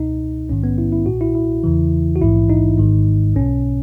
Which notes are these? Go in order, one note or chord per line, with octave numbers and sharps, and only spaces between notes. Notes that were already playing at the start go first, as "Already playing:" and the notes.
Already playing: C#2 B2 D#4
A#1 G#2 D#3 C#4
B3
E4
E4
B1 A#2 F#4
E4
E4
E2 C#3 E3
F#4
A#1 G#2 E3 E4
D#4
G#1 G#2 D#3
B1 B2 C#4